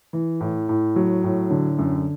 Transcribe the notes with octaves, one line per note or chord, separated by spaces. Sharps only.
E3
A2
A2
F#3
A2
D3
F#2